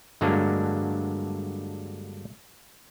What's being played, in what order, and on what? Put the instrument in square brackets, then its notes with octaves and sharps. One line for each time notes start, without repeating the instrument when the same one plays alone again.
[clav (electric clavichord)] G2 D3 F#3 G#3 A#3 D4